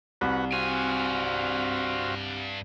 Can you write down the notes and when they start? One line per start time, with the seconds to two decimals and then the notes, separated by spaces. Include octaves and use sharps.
0.21 C2 F#4 B4 F#5
0.53 G2 C4 F#4 F5 G#5